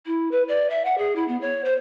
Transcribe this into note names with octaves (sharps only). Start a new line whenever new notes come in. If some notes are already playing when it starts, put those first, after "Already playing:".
E4
B4
D5
E5
F#5
G#4
E4
B3
C#5
C5